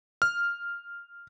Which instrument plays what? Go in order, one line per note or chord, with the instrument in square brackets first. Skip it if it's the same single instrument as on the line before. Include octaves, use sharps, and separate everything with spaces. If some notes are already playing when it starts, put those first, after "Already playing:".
[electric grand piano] F6